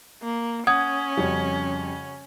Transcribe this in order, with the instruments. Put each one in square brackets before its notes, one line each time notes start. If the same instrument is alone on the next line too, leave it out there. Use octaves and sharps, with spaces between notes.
[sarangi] A#3
[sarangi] C#4 [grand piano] F#5 [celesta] D#6 G#6
[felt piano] F2 G3 [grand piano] C#3 F#4 C#5